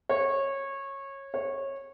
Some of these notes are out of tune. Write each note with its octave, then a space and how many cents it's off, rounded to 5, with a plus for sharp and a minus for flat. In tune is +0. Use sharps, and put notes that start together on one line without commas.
C#5 -20
C#5 -20